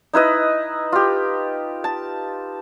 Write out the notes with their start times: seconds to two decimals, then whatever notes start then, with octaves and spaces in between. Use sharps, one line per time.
0.14 D#4 E4 B4 D#5
0.92 F4 G4
1.84 A5